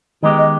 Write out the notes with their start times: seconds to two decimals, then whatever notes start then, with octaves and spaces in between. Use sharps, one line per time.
0.23 D#3 G#3 B3 D#4 G4 D#5
0.38 D#5